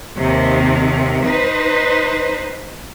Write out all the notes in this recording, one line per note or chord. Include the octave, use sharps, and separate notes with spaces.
D#2 C3 D#3
D#4 B4 C5